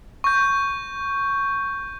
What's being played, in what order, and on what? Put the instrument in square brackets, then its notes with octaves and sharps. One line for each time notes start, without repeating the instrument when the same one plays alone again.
[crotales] C#6 G6